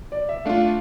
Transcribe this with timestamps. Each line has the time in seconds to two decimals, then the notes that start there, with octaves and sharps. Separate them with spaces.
0.12 D5
0.29 E5
0.45 A3 D4 F4 F5